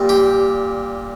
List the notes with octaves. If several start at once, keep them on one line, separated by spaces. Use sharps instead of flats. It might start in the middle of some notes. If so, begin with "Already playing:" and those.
Already playing: A#2 G3
G4